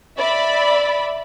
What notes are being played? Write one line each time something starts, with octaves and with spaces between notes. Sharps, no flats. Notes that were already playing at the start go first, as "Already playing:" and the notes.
D5 E5 B5